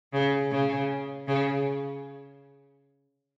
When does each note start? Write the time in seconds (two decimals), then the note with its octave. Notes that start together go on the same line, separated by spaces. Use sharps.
0.13 C#3
0.51 C#3
1.28 C#3